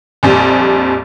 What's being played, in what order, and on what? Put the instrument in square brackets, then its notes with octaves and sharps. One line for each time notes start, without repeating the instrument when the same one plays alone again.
[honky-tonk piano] A#1 F2 G3